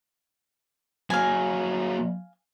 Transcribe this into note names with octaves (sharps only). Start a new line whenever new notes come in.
F#3 A#3 F5 G#5